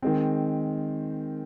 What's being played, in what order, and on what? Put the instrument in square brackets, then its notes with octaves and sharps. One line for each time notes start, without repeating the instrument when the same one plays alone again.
[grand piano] D#3 G#3 C4